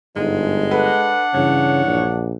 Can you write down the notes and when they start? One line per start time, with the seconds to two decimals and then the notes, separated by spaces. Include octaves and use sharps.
0.16 G1 G#2 G#3
0.71 D4 A4 B4 F#5
1.34 G2 C#3 E3 C#5
1.86 A#1